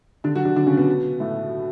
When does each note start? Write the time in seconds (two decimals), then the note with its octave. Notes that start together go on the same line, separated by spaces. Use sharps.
0.24 D3 D4
0.35 F#3 F#4
0.45 D3 D4
0.56 D3 D4
0.67 C#3 C#4
0.77 B2 B3
1.20 A2 A3